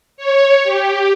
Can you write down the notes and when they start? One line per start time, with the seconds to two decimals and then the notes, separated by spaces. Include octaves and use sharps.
0.17 C#5
0.63 G4